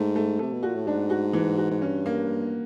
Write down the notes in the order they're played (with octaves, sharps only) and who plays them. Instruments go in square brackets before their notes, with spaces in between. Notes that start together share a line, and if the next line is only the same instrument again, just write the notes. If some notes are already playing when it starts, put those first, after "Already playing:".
Already playing: [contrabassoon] G#2 [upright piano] A3
[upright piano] A3
[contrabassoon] C3 [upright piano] A3
[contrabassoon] B2
[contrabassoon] A#2 [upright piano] F#4
[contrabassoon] A2
[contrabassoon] G#2 [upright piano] D4
[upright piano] F#4
E3
F#4
[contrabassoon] G#2
[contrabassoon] G2 [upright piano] C#4
[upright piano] A#3